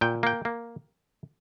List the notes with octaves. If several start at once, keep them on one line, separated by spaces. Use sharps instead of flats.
A#2 G5
A#3 G5
A#3